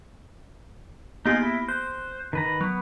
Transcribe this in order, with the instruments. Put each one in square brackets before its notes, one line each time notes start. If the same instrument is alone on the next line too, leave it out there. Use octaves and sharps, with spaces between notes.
[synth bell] A#3 B3 G4 [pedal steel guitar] D#4 F4 G#4
[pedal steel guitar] E4
[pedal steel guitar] C5 [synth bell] F#6
[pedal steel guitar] D#3 B4 A#5
[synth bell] F#3 [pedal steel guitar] B3